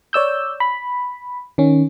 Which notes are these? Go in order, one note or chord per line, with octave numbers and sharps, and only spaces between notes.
C#5 D5 E6 G6
B5
D#3 C#4